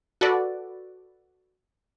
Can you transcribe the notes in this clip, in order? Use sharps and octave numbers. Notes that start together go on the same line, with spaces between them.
F#4 A4 B4 D5